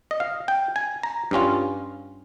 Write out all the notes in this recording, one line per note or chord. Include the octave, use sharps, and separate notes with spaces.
D#5
F5
G5
G#5
A#5
G2 G3 C#4 F4